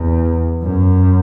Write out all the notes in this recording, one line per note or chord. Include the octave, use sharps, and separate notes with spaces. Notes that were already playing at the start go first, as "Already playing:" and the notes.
Already playing: E2
F#2